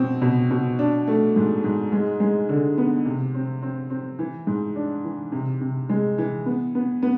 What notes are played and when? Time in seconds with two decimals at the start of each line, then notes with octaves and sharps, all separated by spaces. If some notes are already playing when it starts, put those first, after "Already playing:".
Already playing: B2 C4
0.22 B2
0.50 B2
0.79 D4
1.07 A3
1.36 G#2
1.64 G#2
1.92 G#3
2.20 G#3
2.49 D3
2.78 B3
3.06 C3
3.34 C4
3.62 C4
3.90 C4
4.19 E3
4.47 G#2
4.76 D4
5.04 E3
5.32 C3
5.61 C3
5.89 G#3
6.18 E3
6.46 B3
6.75 B3
7.02 B3